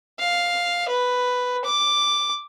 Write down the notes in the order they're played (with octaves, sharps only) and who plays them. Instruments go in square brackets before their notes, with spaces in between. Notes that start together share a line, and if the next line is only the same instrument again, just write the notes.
[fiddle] F5
B4
D6